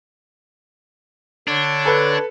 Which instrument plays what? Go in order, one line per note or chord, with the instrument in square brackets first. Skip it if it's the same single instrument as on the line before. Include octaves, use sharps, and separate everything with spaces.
[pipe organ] D3 C#5 [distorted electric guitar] D4
[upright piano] A4 B4